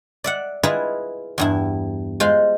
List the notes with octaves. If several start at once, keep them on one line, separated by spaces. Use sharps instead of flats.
D5 E5 F#5
E4 F4 G#4 B4 D#5 E5
E2 G2 E4
G#3 F4 C5 C6